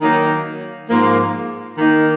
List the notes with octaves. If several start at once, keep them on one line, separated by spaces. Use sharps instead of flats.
D#3 F#3 A#3 D#4
G#2 F3 A#3
D#3 A#3 D#4